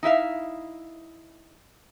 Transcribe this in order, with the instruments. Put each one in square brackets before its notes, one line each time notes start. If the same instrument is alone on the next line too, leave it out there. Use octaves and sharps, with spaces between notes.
[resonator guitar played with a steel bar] D#4 E4 E5 F5